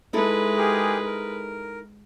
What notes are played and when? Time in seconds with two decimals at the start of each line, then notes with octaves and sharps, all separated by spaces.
0.13 G#3 D#4 E4 A4 B4
0.57 G4 G#4 A#4
1.04 A#4